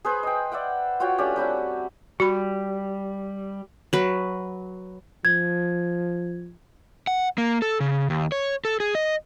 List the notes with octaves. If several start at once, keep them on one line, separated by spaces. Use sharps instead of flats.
G#4 B4 C5 B5
D#5 G5
D5 E5 F#5 G5
F4 F#4 C#5 G5
A3 C#4 D4 G4
G3 C4 C#4 F#4
G3 F#4 B5
F#3 B4
F3 G#6
F#5
A#3
A4
C#3
D#2
C#5
A4
G#4
D#5